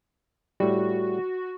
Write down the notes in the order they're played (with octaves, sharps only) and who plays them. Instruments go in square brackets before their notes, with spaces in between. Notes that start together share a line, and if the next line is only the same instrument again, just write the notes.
[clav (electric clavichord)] A2 G3 [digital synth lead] F#4